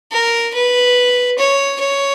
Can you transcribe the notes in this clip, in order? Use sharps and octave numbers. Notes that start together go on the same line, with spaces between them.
A#4
B4
C#5
C#5